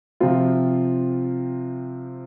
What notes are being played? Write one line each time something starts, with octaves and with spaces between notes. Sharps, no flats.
C3 F3 C4 F4